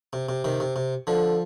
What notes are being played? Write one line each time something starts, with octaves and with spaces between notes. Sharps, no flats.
C3
C3
C3 D#3
C3
C3
D3 F3